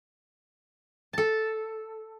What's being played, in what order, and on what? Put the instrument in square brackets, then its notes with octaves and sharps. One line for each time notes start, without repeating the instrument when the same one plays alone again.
[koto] A4 A5